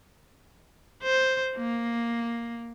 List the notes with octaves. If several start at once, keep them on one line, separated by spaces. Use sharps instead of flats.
C5
A#3